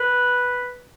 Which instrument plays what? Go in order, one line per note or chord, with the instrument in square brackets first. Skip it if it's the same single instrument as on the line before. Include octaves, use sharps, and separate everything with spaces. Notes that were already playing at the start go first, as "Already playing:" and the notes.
Already playing: [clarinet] B4